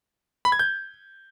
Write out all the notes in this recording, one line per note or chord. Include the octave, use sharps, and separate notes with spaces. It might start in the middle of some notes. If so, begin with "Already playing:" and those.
B5
G#6
G6